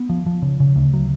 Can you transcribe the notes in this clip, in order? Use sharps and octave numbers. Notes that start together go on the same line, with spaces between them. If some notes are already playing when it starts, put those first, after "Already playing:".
Already playing: B3
F3
F3
C#3
C#3
D2
F#3